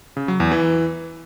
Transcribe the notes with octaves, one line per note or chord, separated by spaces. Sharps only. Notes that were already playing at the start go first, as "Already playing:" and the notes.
C#3
F#3
E2
E3